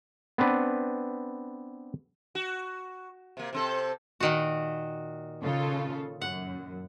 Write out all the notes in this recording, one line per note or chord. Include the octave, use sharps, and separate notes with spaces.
B3 C4 D4 B4
F#4
C3 A#3
C3 C4 A4
A#2 D#3 F#4
C#3 F4 A4
F#2 F#5